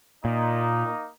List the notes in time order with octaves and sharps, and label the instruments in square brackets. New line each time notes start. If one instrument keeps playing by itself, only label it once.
[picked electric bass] A#2 [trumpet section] A#3 D#4